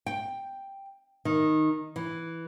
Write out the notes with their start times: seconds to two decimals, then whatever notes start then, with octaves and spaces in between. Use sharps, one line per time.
0.06 G5
1.25 D#3
1.96 E3